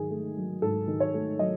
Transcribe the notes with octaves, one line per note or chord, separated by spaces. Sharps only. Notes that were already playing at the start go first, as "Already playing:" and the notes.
Already playing: G#2 D#3 F#3 G#4
A3
F#3
G#2 A4
D#3
C#5
A3
F#3 D#5